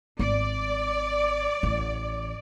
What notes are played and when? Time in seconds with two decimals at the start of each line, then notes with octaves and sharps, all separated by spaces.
0.19 G#1 D5
1.63 A1